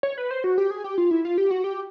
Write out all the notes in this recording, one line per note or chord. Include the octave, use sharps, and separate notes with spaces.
C#5
B4
C5
F#4
G4
G#4
G4
F4
E4
F4
G4
F#4
G4